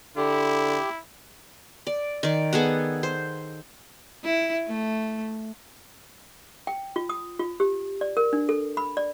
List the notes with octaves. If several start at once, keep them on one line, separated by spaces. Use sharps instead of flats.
D3 E4 G4
D5
D#3 D5
B3 G#4 A4 F#5
C5
E4
A3
G5
F4
D#6
F4
G4
D5
A#4
D4
A4
B5
D5